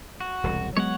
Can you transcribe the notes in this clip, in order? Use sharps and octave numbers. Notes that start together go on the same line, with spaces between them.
F#4
E1 C2
F#3 G#3 B3 C#5 F#5